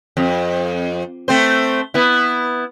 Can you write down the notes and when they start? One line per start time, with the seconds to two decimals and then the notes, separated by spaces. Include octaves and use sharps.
0.17 F2
1.28 A3 C4 C5
1.94 B3 E4